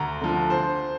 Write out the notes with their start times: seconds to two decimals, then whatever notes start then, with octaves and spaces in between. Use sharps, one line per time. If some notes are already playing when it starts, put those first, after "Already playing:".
Already playing: D2 A#5
0.21 D3 F3
0.50 C5